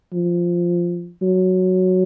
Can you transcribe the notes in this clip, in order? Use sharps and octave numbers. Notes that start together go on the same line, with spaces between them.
F3
F#3